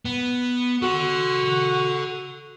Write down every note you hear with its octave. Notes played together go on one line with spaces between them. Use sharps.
B3
F#4 A4 F#5